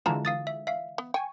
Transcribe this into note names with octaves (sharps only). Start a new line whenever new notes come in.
D3 E3 G#3 F4 F#4 A5 A#5
F5 D#6 A6
E5
E5 F5
B3
G5 G#5 C#6